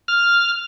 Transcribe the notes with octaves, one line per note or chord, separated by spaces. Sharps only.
F6